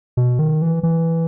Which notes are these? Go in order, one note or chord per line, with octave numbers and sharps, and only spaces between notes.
B2
D#3
E3
E3